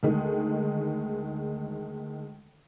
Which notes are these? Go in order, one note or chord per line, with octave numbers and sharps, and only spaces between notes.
D2 D#3 G#3